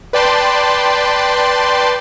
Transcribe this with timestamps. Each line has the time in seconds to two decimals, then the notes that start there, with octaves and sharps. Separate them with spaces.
0.13 B4 D5 G5 A5 C6